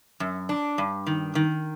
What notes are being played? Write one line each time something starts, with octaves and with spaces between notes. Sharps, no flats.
F#2
D4
G2
D#3
D#3